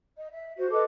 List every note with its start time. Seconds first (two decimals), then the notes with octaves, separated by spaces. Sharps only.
0.15 D#5
0.31 E5
0.57 F#4 C5
0.71 A4 B4 D#5 D6